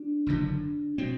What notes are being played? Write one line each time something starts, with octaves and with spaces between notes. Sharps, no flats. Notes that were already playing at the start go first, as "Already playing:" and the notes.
Already playing: D4
F#1 F#2 D3
B2 C4